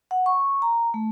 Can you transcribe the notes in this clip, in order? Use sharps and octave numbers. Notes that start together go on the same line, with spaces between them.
F#5
C#6
A#5
A3